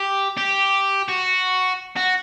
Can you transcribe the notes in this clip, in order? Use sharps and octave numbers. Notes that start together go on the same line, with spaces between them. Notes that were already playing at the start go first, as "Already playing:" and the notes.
Already playing: G4
G4
F#4
F#4